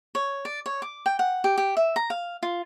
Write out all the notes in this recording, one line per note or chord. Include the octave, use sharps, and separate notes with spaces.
C#5
D5
C#5
D6
G5
F#5
G4
G4
E5
A#5
F5
F4